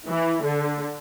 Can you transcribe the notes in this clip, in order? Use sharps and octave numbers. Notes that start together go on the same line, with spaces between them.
E3
D3